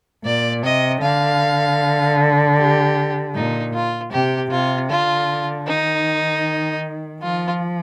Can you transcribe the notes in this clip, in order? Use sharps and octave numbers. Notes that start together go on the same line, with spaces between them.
A#2 D5
C3 D#5
D3 F5
G4
A#2 D#4
F4
C3 G4
C3 F4
D3 F4
D#3 D#4
F3 F4